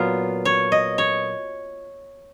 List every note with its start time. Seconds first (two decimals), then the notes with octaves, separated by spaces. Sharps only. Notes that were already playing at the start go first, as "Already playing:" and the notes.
Already playing: A#2 F#3 B3 F4
0.45 C#5
0.72 D#5
0.98 C#5